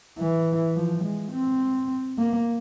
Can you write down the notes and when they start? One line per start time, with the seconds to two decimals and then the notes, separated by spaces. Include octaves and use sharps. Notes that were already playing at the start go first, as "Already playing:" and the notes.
0.19 E3
0.76 F3
1.04 G#3
1.33 C4
2.18 A#3